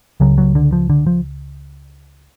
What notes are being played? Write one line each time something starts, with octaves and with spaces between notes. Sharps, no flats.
C#2 C#3 F#3
F#3
D3
F3
D3
F3